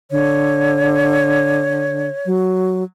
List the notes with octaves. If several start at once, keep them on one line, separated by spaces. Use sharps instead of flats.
D3 C#5
F#3